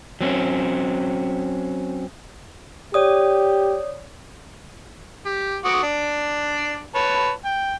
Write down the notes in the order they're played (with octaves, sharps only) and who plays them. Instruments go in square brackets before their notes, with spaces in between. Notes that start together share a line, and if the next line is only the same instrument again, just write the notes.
[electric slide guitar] F#3 C4 C#4
[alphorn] G4 [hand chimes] C#5 D5 D#6
[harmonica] G4
F#4 D6 D#6
D4 D5
B4 C#5 A5
G5